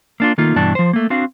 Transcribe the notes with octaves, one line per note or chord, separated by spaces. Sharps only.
A#3 D4 F4
D#3 A3 A#3 D#4 F4
G2 B2 E3 D4 A5
F3 C5
A3 A#3
C4 D4 F#4 F5